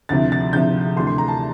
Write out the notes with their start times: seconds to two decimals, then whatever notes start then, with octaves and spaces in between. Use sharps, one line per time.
0.09 D2 C3 F3 C4 E4 A6
0.32 A6
0.53 D2 C3 F3 C4 E4 G6
0.96 D2 C3 E3 A3 C6
1.07 C6
1.18 A#5
1.28 A5